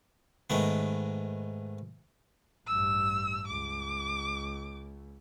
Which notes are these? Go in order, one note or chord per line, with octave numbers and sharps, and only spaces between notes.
G#2 D#3 A3 B3
A1 G2 E6
C#2 D6